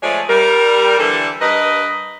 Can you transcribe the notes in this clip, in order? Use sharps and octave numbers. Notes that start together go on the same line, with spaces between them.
F3 G#3 A3 G#4 C#5 D5
G3 A#4
D3 E3 G3 A4
G2 A#4 B4 D#5